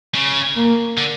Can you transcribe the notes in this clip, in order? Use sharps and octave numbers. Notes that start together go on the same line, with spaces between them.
C#3
A#3
D3